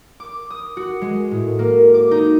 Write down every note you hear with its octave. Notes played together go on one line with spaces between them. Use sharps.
D6
D#6
F#4
G#3
A2
A#3
D6
D#4